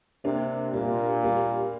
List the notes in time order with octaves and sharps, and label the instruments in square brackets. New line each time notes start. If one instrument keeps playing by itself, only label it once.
[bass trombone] C3 [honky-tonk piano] A#3 D4
[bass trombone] A#2 [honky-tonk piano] G3 A#3
[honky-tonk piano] G3 A#3